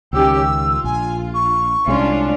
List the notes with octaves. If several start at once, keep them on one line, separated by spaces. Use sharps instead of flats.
C#2 D#3 C#4 G4 E6
F4
A#1 G#5
C#6
C2 G#3 C#4 D4 F4